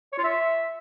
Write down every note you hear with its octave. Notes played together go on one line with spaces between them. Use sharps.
C#5
F4
E5